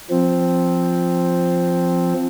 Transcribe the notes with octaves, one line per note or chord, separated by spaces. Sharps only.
F3 C4